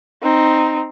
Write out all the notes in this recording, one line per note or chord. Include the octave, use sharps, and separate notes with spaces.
C4 D#4